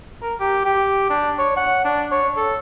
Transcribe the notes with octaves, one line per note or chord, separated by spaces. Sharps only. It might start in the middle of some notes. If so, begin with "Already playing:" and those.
A#4
G4
G4
D4
C#5
F#5
D4
C#5
A4